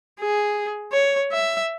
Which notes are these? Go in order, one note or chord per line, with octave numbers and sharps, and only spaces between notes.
G#4
C#5
E5